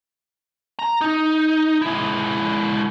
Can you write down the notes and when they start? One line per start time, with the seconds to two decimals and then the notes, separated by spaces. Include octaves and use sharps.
0.79 A#5
1.01 D#4
1.82 G#3 E4